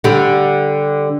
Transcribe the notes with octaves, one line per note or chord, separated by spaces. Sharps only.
D3 G3